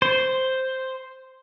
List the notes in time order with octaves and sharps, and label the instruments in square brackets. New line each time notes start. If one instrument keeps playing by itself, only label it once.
[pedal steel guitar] C5